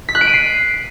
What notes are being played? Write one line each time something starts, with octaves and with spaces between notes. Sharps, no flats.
B6
F#6
D7
D#7
C7